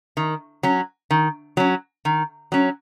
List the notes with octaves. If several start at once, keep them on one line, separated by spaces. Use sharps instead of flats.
D#3
F#3 C#4
D#3
F#3 C#4
D#3
F#3 C#4